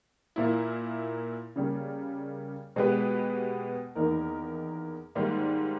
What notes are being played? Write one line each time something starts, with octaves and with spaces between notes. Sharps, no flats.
A#2 A#3 E4
C#3 G3 A#3 C#4
B2 G#3 B3 G4 B4
E2 D#3 A#3 D#4 A#4
G#2 D#3 G3 A#3